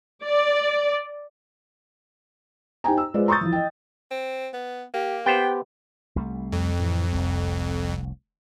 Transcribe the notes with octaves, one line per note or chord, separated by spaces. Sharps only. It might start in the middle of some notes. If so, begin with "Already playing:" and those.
D5
D#4 G4 C5 G5 G#5 A#5
E6
G#3 F4 B4 C5 D5
A#5 C6 C#6 D#6 G6 A6
E3 F3 E4
D#5 G5
C4
B3
A#3 G4
B3 G4 C5 G5
C2 G3 A3
F2
A2 E3
F1 C2